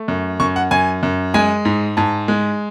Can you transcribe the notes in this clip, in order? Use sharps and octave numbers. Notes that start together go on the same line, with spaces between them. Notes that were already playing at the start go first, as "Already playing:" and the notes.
Already playing: A3
F#2
F#2 C#6
F#5
F#2 G#5
F#2
G#3 G#5
G#2
G#2 A5
G#3